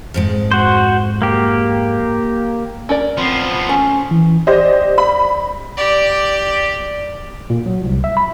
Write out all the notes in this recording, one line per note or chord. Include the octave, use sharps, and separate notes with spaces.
F2 G#2 G#3
F#4 C5
A#3 G4
C#4 A#4 D5
F3 B3 C4
A3 C#4
E3
G4 C5 D5 D#5
B5
G4 D5
A#2
F#3
C2
E5
B5